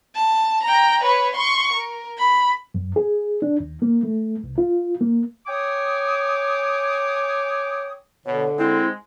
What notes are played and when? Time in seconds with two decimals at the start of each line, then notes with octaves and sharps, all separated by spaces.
0.15 A5
0.63 G5 A#5
1.03 B4 C#5
1.35 C6 C#6
1.73 A#4
2.18 B5
2.75 F#2
2.96 G#4
3.42 D4
3.60 D#2
3.82 A#3
4.03 A3
4.44 C2
4.58 F4
5.01 A#3
5.47 C#5 G5 G#5 D6 D#6
8.26 B2 D3 C#5
8.59 G#3 C4 E4